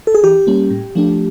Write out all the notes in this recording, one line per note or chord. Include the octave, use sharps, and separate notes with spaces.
A4
G#4
E3 G4
G3 A#3 C#4
A2
F3 A3 D4